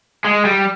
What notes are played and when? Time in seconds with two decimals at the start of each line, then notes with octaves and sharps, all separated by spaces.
0.25 G#3
0.45 G3